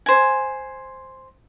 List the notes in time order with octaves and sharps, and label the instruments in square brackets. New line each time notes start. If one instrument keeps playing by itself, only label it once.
[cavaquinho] C5 G#5